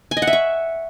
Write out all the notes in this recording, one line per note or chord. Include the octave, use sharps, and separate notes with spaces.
G#5
D#5
F#5
E5
C#6